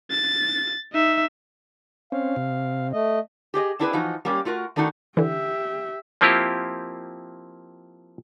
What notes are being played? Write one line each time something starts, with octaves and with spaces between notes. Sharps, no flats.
A6
D#4 E5
C4 C#4 F5
C3
A3 D#5
G4 G#4 D5 D#5
C4 D4 E4 G#4 A4 B4
E3 F3 D#4 F#4
G3 A#3 C#4 G4
A3 F4 F#4 A#4
D#3 A3 D4 D#4 F#4
D3 E3 G4 E5
F3 A#3 C4 E4 F4 G4